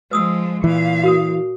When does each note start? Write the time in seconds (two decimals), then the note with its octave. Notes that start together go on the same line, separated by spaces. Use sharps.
0.11 F3 G#3 B4 D#6 E6
0.64 A#2 E3 F5
1.04 F#4 A#4 D#6